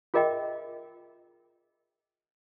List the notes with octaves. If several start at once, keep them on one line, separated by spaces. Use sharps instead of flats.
F4 G#4 A#4 D#5 E5 G5